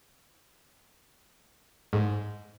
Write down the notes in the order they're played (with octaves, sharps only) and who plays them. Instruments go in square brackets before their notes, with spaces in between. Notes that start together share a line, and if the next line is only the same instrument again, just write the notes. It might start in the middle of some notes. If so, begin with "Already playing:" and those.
[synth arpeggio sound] G#2